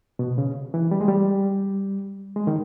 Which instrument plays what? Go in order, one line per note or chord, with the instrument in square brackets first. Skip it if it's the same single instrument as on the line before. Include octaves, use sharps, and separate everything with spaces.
[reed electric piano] B2
C#3
E3
G3
G#3
G3
G#3
D#3